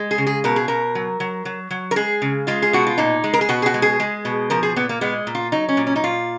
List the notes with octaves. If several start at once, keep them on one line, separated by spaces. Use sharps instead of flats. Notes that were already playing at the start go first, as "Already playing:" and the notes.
Already playing: G#3
G#4
C#3
G#4
B2 A#4
G#4
B2 A#4
F#3
F#3
F#3
F#3
A#4
G#3 G#4
C#3
G#3 F4
G#4
B2 F#4
F4
A#2 D#4
G#3
A#4
G#4
B2 F#4
G#4
F#4
G#3
G#4
G#3
B2
F3 A#4
G#4
A#2 B3
A#3
G#3 B3
A#2
F4
F#3 D#4
C#4
A#2
C#4
D#4
A#2 F4